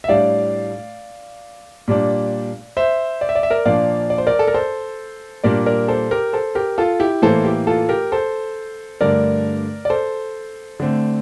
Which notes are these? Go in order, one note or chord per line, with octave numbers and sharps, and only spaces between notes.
E5
A2 G3 D4 D5 F5
A#2 G3 D4
C5 E5
D5
E5
D5
E5
A#4 D5
A#2 F3 A#3 D4 D5 F5
D5
C5
A#4 D5
A4
A#4
A4 C5
A#2 G3 D4 A#4 D5
A#4 D5
A4 C5
G4 A#4
A4 C5
G4 A#4
F4 A4
E4 G4
A2 E3 A#3 A4 C5
E4 G4
F4 A4
G4 A#4
A4 C5
G2 D3 A3 D4 A#4 D5
D5
A4 C5
D3 A3 C4